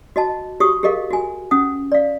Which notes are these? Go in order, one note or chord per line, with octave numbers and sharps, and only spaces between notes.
F#4 D#5 A5
F#4 G4 C#6 D#6
G4 G#4 A#4 D#5 F5
F#4 G#5
C#4 F#5 D#6
D5 F5